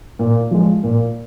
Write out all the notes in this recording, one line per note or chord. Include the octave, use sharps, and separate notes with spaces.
A#2
F3 G#3
A#2